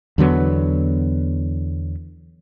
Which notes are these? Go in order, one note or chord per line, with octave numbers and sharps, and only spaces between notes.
E2 D3 F#3 B3